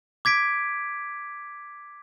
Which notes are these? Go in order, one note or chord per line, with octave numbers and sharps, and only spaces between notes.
D6 G#6 B6 D7